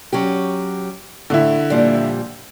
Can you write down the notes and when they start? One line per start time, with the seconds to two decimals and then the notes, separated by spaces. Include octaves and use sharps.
0.13 F#3 C#4 G4
1.30 A2 D3 E4
1.70 A#2 F3 G3